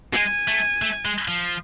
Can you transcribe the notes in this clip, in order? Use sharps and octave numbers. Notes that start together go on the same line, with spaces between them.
G#3 G#5
A3
A3
G#3
F3